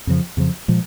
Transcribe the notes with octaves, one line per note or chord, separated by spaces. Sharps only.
F2 C#3 F3
F2 C#3 F3
A#2 F3 G#3